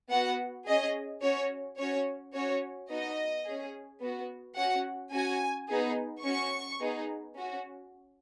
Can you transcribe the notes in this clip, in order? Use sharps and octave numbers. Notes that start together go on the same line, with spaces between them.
B3 F#4 F#5
C#4 G#4 D#5
C#4 F#4 C#5
C#4 F#4 C#5
C#4 F#4 C#5
B3 D#4 F#4 D#5
C#4 G#4
B3 F#4
C#4 F#4 F#5
C#4 F#4 G#5
B3 D#4 G#4
C#4 F#4 C#6
B3 D#4 G#4
C#4 F#4